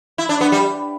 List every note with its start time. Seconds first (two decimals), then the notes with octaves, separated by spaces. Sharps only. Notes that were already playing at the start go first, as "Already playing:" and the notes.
0.18 E4
0.29 D4
0.41 B3
0.52 G3